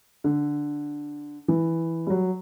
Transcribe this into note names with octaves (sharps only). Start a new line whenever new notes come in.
D3
E3
G3
F#3